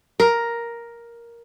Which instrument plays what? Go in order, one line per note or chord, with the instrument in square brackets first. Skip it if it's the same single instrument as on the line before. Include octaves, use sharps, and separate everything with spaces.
[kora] A#4